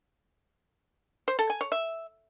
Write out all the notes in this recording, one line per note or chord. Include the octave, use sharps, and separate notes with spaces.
C5
A4
G#5
C#5
E5